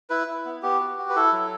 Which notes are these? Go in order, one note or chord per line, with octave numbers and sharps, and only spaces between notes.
E4 B4
E4
B3
B3 G4
F#4
F#4
B4
E4 A4
F#3